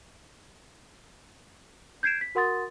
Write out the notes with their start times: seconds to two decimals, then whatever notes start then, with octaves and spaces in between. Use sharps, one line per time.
2.03 G6 G#6 C7 D7 E7
2.21 B6
2.35 F#4 A#4 F#5 C6 D#6 A6